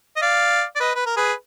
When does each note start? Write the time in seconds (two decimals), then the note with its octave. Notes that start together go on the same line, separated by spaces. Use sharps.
0.16 D#5
0.22 D5 F5
0.76 D5
0.80 B4 D#5
0.95 B4
1.06 A#4
1.17 G#4 B4